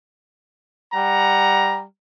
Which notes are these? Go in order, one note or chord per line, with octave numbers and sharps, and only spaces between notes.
G3 F#5 A#5